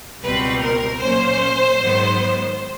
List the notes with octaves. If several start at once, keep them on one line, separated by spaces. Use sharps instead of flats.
C#2 B2 G3 C4 B4
A#4
A#2 F#3 A#3 C#4 C5
G#2 D#3 F#3 B3